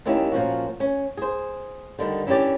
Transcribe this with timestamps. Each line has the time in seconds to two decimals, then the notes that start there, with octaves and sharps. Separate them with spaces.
0.05 D#2 D#3 C#4 E4 G4
0.32 A#2 F3 C#4 F#4
0.80 C#4
1.17 G#4 C5
1.99 D3 D#3 G3
2.27 E3 C#4 D4 G4 D5